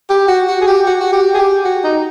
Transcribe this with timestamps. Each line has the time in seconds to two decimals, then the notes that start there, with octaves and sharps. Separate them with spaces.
0.09 G4
0.28 F#4
0.47 F#4
0.61 G#4
0.67 G4
0.86 F#4
1.00 F#4
1.12 G4
1.34 G#4
1.38 G4
1.64 F#4
1.84 D#4